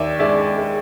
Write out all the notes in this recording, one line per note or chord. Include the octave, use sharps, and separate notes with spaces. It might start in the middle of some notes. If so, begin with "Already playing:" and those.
Already playing: D#2 D5 E5
G#3 D5 E5
G#3